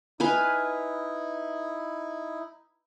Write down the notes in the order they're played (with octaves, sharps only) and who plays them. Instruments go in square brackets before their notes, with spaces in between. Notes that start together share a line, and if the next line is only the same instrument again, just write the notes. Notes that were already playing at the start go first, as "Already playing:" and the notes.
[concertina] D#4 E4 [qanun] B4 F5 G#5